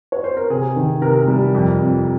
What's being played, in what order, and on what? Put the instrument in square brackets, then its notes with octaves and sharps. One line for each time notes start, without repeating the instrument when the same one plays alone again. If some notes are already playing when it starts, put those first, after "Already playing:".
[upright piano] C#5
C5
A#4
C3 G#4
D#3
C3 A#4
G3
F2
F2